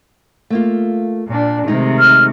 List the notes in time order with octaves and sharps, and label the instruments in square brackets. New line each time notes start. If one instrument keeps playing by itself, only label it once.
[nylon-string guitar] A3 A#3 F4
[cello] A#2 D4
[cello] C3 D#3 [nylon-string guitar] G#3 A3 D#4
[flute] F6